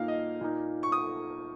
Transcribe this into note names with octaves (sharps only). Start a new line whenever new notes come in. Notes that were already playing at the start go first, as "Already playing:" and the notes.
Already playing: A#2 A#3 D#4 F5
D#5
A#2 A#3 D#4
C#6
D#6